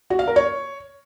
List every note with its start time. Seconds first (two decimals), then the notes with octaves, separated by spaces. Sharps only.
0.10 F#4
0.19 F5
0.28 A#4
0.36 C#5